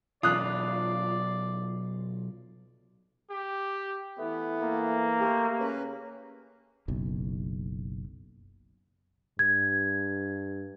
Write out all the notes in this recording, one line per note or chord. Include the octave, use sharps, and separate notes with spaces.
B1 F4 D5 D#6 F#6
G4
E3 A3 B3
A#3
A3 G4
C#3 C#4 B4
F#1 B1
G2 G#6